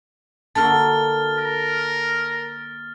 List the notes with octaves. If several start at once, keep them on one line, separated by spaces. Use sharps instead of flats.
D3 A#3 F#4 A5 F6 A6
A#4